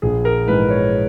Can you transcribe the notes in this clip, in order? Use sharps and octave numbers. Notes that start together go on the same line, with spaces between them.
A#1 G#4
A#4
G#2 E3 G#3 B4
C#5